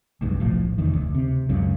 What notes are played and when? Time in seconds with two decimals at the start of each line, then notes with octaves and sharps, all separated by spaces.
0.21 F1 B1 G2
0.40 D1 A#1 A2 F3
0.78 F1 E2 D#3
0.94 D2
1.15 C3
1.49 C#2 F#2 C#3